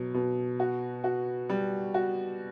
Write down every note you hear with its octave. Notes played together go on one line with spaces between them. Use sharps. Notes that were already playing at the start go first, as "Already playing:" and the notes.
Already playing: B2 F#3
B2
F#4
F#4
G3
F#4